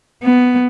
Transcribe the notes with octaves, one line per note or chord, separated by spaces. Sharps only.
B3